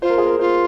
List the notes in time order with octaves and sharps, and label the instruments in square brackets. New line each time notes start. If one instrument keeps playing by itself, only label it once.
[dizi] F4 [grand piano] C5
[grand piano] A#4
G#4
A#4
[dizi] F4 [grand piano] C5